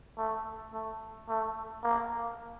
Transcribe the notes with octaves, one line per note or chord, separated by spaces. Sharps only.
A3
A3
A3
A#3